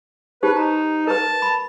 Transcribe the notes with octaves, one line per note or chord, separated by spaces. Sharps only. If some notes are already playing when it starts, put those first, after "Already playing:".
D#4 G4 B4 C5
D#4 A#5
A#4 B4 A5
B5